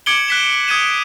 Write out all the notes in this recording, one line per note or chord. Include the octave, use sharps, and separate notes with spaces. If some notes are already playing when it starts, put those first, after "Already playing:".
D6 G#6 C#7 D7 F#7 G7
F#6 B6 E7
D#6 G#6 C#7 D#7 E7